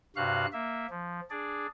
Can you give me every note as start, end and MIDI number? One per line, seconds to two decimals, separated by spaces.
0.16 0.46 43
0.16 0.46 48
0.16 0.46 66
0.16 0.46 77
0.16 0.46 90
0.53 0.86 58
0.53 0.86 76
0.90 1.20 53
1.30 1.67 62
1.30 1.67 68
1.30 1.67 74